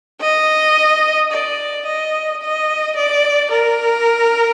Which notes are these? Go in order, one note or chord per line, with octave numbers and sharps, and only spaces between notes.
D#5
D5
D#5
D#5
D5
A#4